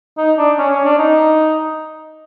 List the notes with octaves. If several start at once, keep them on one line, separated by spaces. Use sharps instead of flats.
D#4
D4
C#4
C#4
D4
D#4